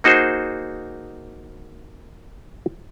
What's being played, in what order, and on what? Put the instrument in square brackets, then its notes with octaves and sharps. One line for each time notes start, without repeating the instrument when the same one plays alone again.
[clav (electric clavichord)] A#3 D#4 F#4 G#4 C5